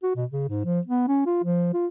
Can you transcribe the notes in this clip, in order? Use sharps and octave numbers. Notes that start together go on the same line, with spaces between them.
F#4
B2
C#3
G#2
F3
B3
C#4
F4
F3
F4